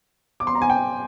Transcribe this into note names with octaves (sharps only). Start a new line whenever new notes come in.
D6
C6
A#5
G#5
G5